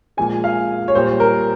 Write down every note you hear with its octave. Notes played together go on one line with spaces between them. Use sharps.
A#2 F3 G#3 G#5
F5
C#5
A#2 G3 C5
A#4